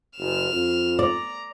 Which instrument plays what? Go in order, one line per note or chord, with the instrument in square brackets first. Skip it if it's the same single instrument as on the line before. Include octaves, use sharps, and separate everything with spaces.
[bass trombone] F#1 [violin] F6 E7
[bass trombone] F2
[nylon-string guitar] D5 [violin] A#5